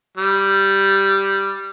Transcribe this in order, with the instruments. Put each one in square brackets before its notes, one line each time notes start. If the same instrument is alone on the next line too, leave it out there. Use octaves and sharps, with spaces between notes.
[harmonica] G3